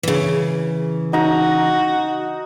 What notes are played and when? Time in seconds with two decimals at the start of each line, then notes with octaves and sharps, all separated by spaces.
0.03 C#3 E3
1.13 D#4 F#4 A#5